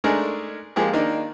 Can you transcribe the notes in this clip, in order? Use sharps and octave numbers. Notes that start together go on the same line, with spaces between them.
G#3 A3 D4 D#4 G#4 A#4
F3 G#3 A#3 G4 G#4
D#3 A#3 D4 D#4